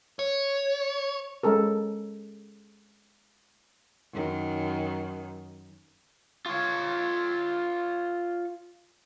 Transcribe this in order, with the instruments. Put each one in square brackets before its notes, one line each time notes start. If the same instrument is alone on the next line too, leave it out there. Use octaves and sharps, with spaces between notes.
[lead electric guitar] C#5
[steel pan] G#3 C#4 A4 A#4
[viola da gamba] F#2 D#3
[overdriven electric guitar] F4 C#5